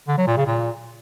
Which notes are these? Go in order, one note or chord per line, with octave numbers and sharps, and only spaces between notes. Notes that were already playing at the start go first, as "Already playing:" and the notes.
D3
F#3
A#2
C#3
A#2